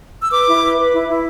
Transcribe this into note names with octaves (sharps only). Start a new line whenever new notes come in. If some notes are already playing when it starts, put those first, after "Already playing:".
E6
B4 D6
E4
B4
B4
E4
E4